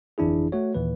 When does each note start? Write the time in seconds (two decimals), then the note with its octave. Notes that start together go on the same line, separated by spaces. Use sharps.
0.18 G1 F2 E3 D4 E4 G#4
0.52 A3 F#4 C#5
0.74 D#2 A#2 E3 B4